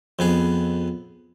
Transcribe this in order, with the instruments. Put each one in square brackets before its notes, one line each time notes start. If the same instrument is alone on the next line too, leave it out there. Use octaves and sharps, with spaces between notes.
[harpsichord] F2 B3 G#4